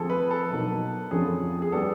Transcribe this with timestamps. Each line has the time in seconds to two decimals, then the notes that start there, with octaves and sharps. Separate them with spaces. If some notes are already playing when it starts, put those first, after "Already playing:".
Already playing: F3 A3 C4 F4 G#4 A4
0.10 B4
0.31 A4
0.50 B2 F#3 A#3 D#4
1.11 F2 D3 F3 A3 C#4 G#4
1.62 G#4
1.72 G3 B3 D4 G4 A4